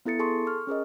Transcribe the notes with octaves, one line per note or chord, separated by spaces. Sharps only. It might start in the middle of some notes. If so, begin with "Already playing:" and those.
B3 E4 A4 A6 C#7
G#4 A4 A5 C6 C#6
C#6 F6
C#4 G#4 A#4 D#5